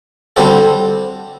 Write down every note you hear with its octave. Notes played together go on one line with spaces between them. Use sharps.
D3 G3 C4 F#4 A4